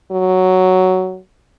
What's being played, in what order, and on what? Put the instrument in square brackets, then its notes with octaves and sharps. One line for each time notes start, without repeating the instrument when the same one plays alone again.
[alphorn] F#3